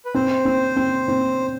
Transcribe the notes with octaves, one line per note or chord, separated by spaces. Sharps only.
B4
C4 C5
C4
C4
C4